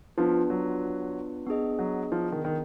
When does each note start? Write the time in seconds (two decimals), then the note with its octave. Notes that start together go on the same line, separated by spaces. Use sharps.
0.18 F3 B3 D4 F4 B4
0.50 F#3
1.47 B3 D4 G#4 D#5
1.79 F#3
2.12 F3
2.32 D#3
2.45 D#3